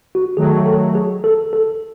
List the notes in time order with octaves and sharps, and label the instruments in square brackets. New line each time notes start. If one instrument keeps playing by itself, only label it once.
[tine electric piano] F#4
[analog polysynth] D#3 F#3 A3 [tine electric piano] G#4
[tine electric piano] A4
G#4
A4
A4